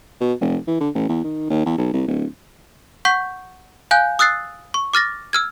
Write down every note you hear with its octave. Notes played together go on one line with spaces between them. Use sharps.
B2
F1
E3
D3
A1
E2
D#3
D#2
E2
B1
C2
D1
F#5 C#6 G6 B6
F5 G#5 F#6 G6
D#6 E6 F#6 A6 C7
C#6
D6 F6 A6 A#6
E6 F6 G#6